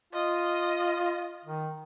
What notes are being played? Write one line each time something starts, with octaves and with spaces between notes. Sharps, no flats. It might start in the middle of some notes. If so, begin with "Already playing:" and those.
F4 D#5
D#3